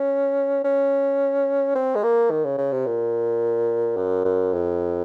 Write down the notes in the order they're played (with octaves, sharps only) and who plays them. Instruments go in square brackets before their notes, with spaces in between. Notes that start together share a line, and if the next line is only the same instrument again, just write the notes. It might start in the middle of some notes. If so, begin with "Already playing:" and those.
Already playing: [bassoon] C#4
C#4
C4
G#3
A#3
D#3
C#3
C#3
C3
A#2
F#2
F#2
F2